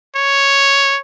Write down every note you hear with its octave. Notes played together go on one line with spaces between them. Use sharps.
C#5